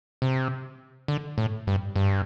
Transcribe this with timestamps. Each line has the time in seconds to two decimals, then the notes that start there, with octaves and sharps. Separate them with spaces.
0.22 C3
1.08 D3
1.38 A2
1.67 G2
1.96 G2